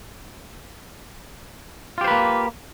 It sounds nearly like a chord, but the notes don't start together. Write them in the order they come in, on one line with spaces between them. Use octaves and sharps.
F4 G4 C5 B4 A#3